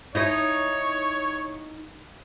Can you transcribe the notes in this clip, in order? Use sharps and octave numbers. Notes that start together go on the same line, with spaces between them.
D#4 E4 C#5 D#5